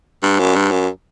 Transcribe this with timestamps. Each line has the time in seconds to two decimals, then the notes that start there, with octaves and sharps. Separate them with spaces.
0.23 G2
0.39 F#2
0.55 G2
0.71 F#2